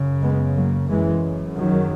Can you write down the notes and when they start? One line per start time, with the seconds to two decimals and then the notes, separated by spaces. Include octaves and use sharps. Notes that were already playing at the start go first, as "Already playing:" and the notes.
Already playing: F#2 C#3
0.22 G#3 B3
0.56 F#3 A#3
0.89 F#2 C#3 E3 G#3
1.57 D#3 F#3